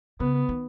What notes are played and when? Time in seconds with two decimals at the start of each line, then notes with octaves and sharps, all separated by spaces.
0.20 C#3 B3
0.49 D#3